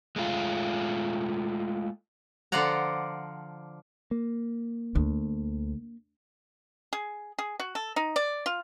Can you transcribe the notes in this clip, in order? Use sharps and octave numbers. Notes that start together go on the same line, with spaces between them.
G#3 A3 F4
D3 F3 F4 D5 F#5 A#5
A#3
D2
G#4
G#4
F#4
A4
D#4
D5
F4